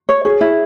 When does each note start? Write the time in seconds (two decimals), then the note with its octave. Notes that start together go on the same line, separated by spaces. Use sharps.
0.09 C#5
0.25 G#4 C#5
0.41 E4